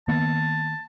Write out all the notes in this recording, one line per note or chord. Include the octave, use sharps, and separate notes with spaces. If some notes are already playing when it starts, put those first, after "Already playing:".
D#3 A#3 B3 A5